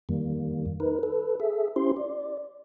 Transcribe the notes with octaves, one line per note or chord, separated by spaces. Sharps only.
F2 D#3 G3 A#3
D#4 A#4 B4
A4 B4
G#4 A4 E5
C#4 E4 G4 C5 C6
D5